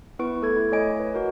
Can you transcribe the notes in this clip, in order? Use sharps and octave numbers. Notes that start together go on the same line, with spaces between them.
B3 E4 B4 C#6 D7
A3 A4 G#6
E4
A3 C#5 D#5 G#5 D7
B4
F#4 A#4